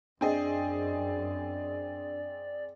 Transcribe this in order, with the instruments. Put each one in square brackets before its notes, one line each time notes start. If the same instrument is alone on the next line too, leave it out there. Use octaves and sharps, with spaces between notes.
[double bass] F#2 [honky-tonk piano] C4 G#4 D#5 [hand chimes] D4 [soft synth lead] D5